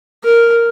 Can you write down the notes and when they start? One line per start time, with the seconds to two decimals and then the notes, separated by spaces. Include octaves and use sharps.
0.24 A#4